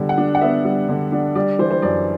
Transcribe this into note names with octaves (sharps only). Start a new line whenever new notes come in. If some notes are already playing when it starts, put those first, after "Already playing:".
Already playing: D3 G3 B3
F#5
D4
F#5
B3 E5
G3
D3
D4
G3 D5
E3 C5
C5
F#2 D5